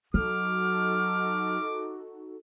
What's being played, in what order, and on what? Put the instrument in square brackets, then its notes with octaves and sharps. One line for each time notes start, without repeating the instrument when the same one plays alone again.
[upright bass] F#3 [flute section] D#4 F#4 A4 [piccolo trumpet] D6 [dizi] F6